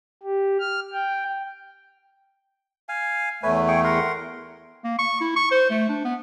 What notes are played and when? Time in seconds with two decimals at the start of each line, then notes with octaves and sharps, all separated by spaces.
0.23 G4
0.60 F6
0.93 G5
2.89 F5 G#5
3.43 E2 A3 B4 C#5 G#5
3.68 G#4 G5 C#6
3.84 A#4 F#5 C6
4.84 A#3
4.99 C#6
5.21 E4
5.36 C#6
5.51 C5
5.70 A3
5.89 D4
6.04 B3